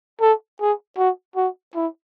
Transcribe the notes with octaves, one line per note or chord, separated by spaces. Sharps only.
A4
G#4
F#4
F#4
E4